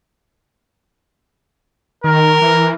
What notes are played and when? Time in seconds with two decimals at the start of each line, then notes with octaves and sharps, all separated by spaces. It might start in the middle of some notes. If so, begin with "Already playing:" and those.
2.04 D#3 A#4
2.42 E3